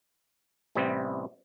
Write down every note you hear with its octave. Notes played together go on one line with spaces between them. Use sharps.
A1 C3 G3 B3 C4